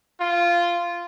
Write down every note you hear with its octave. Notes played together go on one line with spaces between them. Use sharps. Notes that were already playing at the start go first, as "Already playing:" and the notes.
F4